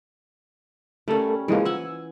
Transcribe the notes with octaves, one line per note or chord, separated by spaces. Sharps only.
G3 A3 C#4 A4 A#4
E3 F3 G3 G#3 A#3
F#5 G#5 E6